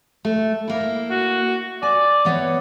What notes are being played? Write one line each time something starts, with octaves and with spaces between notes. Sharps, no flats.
A3
A#3 E4
F#4
D5 G#5
E3 B3 C#5